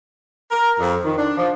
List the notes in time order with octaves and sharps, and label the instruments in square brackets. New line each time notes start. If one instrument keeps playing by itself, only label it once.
[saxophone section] A#4
F2
D#3
D4
F3